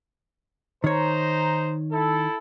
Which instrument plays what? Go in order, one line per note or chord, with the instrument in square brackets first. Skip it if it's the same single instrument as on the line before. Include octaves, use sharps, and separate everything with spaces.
[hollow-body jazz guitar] D#3 C#5 [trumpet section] D#4 C5 A#5
[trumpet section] E4 A4